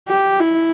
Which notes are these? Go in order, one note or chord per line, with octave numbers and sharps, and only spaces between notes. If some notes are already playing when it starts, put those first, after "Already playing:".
G4
E4